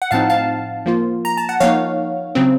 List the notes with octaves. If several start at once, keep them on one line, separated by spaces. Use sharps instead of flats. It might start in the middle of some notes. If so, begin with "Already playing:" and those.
F#5
A2 F3 C4 D#4 F5 A5
F5 A5
F3 A#3 F4
A#5
A5
F#5
F3 A#3 D#4 C#5 F5
C#3 F#3 C4